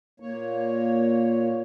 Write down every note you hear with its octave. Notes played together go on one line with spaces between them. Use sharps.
A#2 A#3 C#5